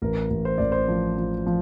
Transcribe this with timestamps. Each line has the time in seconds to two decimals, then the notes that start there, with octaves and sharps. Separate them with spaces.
0.02 A1 A#4
0.30 A1
0.45 C5
0.58 A1 D5
0.72 C5
0.88 F3
1.18 F3
1.46 F3